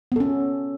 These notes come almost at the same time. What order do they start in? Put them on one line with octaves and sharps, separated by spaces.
B3 A4 C#4